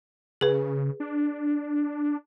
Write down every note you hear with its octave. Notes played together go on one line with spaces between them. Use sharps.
C#3 G#4 B4
D4